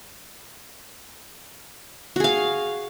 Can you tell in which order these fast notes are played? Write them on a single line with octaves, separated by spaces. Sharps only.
F#4 G#4 F5